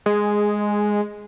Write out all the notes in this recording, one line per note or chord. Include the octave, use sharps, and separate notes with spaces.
G#3